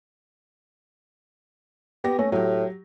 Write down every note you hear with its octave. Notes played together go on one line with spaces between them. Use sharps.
B3 G4 A#6
A3 C#4
A2 F#3 G4